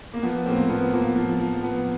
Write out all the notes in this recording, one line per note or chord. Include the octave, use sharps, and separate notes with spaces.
A#3
F3 B3
A2 A#3 C4
F3 B3
F3 A#3
F3
F3
F3 B3